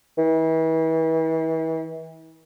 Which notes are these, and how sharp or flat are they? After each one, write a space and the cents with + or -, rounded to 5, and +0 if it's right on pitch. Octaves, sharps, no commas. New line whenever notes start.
E3 -35